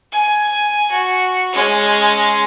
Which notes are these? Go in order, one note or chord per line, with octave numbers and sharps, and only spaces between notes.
G#5
F#4
G#3 C#4